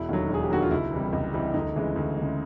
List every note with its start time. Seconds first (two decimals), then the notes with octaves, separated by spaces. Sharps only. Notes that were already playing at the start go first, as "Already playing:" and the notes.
Already playing: E1 E4
0.09 D#2 D3 F#3
0.29 E1 G#4
0.43 G4
0.50 D#2 D3 F#3 F#4
0.62 F4
0.71 C#2 E4
0.92 C3 E3 G3
1.13 C#2
1.34 C3 E3 G3
1.54 D2 D#4
1.75 C#3 E3 G#3
1.96 D2
2.17 C#3 E3 G#3